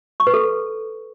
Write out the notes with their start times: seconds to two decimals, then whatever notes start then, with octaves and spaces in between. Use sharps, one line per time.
0.20 C#6
0.27 B4
0.34 A4